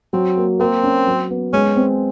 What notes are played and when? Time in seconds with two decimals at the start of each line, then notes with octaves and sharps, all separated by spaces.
0.13 F#3 C4
0.37 A#3
0.59 A#3 C4
0.83 C#4
1.07 F#3
1.30 B3
1.53 G#3 C#4
1.76 C4